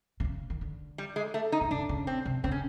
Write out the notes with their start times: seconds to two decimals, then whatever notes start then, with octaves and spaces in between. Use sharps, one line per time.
0.20 C3
0.25 C#3
0.50 D#3
0.61 D3
0.98 G3
1.16 G#3
1.34 A3
1.52 D#4
1.61 D3
1.71 C#3 D4
1.89 C#3
2.07 C4
2.26 C3
2.44 C#3 C4
2.52 C#4